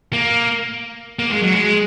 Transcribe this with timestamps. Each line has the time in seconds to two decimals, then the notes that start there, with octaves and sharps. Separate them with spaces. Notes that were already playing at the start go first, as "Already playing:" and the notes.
0.13 A#3
1.19 A#3
1.31 G#3
1.42 F#3
1.55 G#3